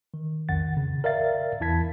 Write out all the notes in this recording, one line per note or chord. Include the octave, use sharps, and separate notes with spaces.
D#3
B1 F2 D#3 F#5 A6
C#3
A#4 D5 E5 F5 A6
E2 E3 E4 A5 G#6 B6